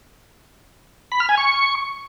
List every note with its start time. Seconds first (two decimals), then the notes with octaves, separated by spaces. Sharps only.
1.12 B5
1.20 F6
1.29 G#5
1.38 C#6